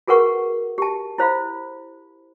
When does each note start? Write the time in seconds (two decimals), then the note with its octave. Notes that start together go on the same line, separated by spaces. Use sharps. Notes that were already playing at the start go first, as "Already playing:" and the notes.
0.07 F#4 G#4 A#4 B4 F#5 C#6
0.78 G4 A5
1.18 E4 C5 F5 B5